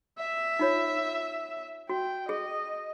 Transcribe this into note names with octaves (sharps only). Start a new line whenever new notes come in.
E5
D#4 F4 C#5
F#4 G5
G#4 D#5